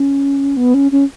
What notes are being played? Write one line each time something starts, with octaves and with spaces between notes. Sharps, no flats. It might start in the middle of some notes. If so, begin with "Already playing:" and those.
Already playing: C#4
B3
C#4
C#4